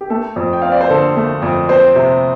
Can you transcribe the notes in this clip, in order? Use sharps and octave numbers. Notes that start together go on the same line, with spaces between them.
G4
A3 A4
F2
G5
C4 F5
D5
C5
D3 A4
A3
F2
C4 C5
C3